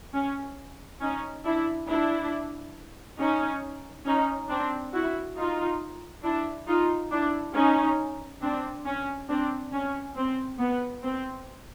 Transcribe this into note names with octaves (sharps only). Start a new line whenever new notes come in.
C#4
C#4 D#4
D4 E4
D4 E4
C#4 D#4
C#4 D#4
C4 D4
E4 F#4
D#4 F4
D4 E4
D#4 F4
D4 E4
C#4 D#4
C4 D4
C#4
C4 D4
C#4
C4
B3
C4